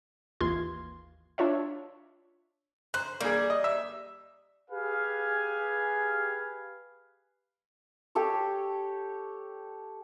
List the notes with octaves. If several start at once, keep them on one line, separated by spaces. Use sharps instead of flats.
G#1 D#2 E3 F4 C6 G#6
D4 F4 C#5 E5
C5 F#6
G3 A#3 G#4
D#5
E5
G4 G#4 B4 F5 G#5
G4 A4 C#5